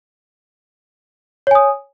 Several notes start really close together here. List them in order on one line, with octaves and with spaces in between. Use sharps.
C#5 G#5 D#6